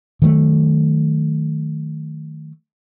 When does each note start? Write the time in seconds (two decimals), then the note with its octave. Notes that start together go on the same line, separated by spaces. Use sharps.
0.22 D#3 F#3 G#3 A3